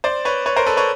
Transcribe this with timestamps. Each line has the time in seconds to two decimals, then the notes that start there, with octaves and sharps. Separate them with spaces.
0.04 C5 D5
0.25 B4 C#5
0.46 B4 C#5
0.56 A#4 C5
0.66 A4 B4
0.77 B4 C#5